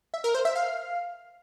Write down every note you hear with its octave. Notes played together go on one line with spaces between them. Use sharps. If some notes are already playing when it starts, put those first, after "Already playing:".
E5
A#4
C5
E5
F5